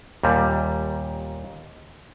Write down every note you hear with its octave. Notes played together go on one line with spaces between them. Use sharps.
D#2 A#2 G3